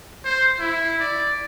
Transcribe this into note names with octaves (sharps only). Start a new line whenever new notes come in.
C5
E4
D5